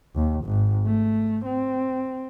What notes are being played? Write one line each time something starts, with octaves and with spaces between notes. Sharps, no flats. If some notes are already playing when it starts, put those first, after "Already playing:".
D#2
G#1
A3
C4